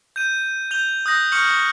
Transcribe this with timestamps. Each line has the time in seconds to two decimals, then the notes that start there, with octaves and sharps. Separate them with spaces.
0.16 G6 D#7
0.71 G6 F7 G7
1.06 D#6 F#6 G6 A#6
1.32 C#6 F6 G6 C#7 F#7